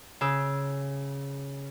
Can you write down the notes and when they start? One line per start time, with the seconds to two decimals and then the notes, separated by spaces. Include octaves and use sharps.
0.21 C#3 E6